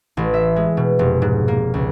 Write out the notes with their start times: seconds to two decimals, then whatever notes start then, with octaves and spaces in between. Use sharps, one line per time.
0.17 A1
0.34 E5
0.56 G#3
0.77 B2
0.99 F1
1.22 G#2
1.48 A#3
1.74 C#2